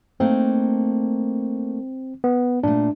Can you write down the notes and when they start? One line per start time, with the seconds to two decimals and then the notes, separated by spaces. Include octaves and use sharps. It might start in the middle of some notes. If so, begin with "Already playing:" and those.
0.20 A3 A#3 C4 D#4
2.24 B3
2.63 A#2 A3 D4